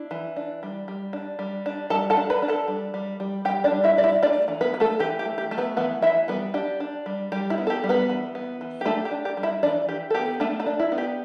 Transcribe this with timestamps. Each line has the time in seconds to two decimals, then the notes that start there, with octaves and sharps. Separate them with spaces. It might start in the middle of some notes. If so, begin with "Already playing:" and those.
Already playing: D4 E4
0.11 E3
0.36 D4
0.63 G3
0.88 G3
1.13 D4
1.39 G3
1.66 D4
1.90 G3 A4 A5
2.10 A4 A5
2.17 D4
2.30 B4 B5
2.42 D4
2.48 A4 A5
2.68 G3
2.94 G3
3.20 G3
3.45 G3 G4 G5
3.64 D4 D5
3.71 G3
3.84 E4 E5
3.97 G3 D5
4.04 E4 E5
4.22 A3 D4 D5
4.48 E3
4.61 B3 B4
4.74 E3
4.80 A3 A4
4.99 E3 G4
5.19 G4
5.26 A3
5.38 G4
5.51 A3
5.58 B3 B4
5.77 E3 B3 B4
6.02 E3 E4 E5
6.28 G3 B3 B4
6.54 D4 G4
6.80 D4
7.06 G3
7.32 G3 G4
7.50 E4
7.58 B3
7.67 A4
7.70 G4
7.84 G3
7.89 B3 B4
8.09 E3
8.35 B3
8.61 E3
8.81 G4
8.85 A3 D4 A4
9.05 G4
9.11 D4
9.25 G4
9.37 G3
9.43 E4 E5
9.63 E3 D4 D5
9.89 E3 G4
10.10 A4
10.14 B3 G4
10.40 A3 D4 A4
10.60 A3 A4
10.66 D4
10.79 E4
10.92 B3
10.98 G4